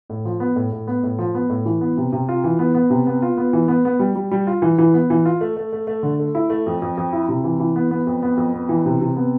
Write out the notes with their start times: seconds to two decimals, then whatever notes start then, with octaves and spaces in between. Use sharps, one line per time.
0.10 A2
0.25 F3
0.40 B3
0.56 A2
0.72 A2
0.87 B3
1.03 A2
1.19 F3
1.35 B3
1.49 A2
1.65 E3
1.81 B3
1.97 C3
2.12 C3
2.29 F4
2.44 E3
2.59 B3
2.74 B3
2.90 C3
3.07 B3
3.22 F4
3.37 B3
3.53 E3
3.68 B3
3.85 B3
3.99 G3
4.15 G3
4.31 G3
4.47 F4
4.62 E3
4.78 E3
4.94 B3
5.10 E3
5.26 F4
5.41 A3
5.56 A3
5.72 A3
5.87 A3
6.03 D3
6.19 A3
6.35 E4
6.50 A3
6.66 F2
6.82 F2
6.97 F2
7.13 E4
7.28 C3
7.44 E3
7.60 E3
7.76 B3
7.91 B3
8.07 F2
8.22 B3
8.37 F2
8.53 B3
8.69 E3
8.85 C3
9.01 C3
9.16 B3